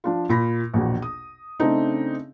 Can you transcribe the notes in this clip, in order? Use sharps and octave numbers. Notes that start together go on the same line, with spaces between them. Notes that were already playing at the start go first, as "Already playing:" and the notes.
F3 D4 F4
A#2 B5 A#6
A#1 E2 B2
D#6
C#3 A3 C4 D4 D#4